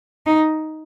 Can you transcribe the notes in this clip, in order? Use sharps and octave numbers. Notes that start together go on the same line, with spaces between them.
D#4